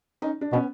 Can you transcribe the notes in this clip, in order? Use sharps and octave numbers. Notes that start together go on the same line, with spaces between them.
C#4 D#4
D4
B2 B3 C#4